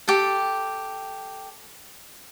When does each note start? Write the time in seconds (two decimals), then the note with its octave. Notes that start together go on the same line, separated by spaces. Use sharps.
0.08 G4 A4